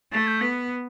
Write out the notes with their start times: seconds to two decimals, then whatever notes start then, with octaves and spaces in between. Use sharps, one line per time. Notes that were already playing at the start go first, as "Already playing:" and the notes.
0.12 A3 A6
0.27 G6
0.41 B3 B6